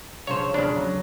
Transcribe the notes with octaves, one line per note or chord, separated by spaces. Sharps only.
G2 C#3 F3 C5 C#5
E1 C#3 D4 C#5 B5
F#3